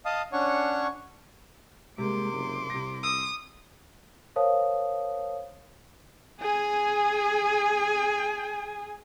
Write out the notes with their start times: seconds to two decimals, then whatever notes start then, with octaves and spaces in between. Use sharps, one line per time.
0.05 D#5 F5 A5 D#6
0.33 C#4 D4 C#5 F#5 C#6
1.98 C3 G3 G#3 A#3 C6 D6
2.33 F#1
2.70 C2 C3 A#6
3.03 D#6 E6
4.36 A#4 C5 C#5 F5 A5 D#6
6.40 G#4 G#5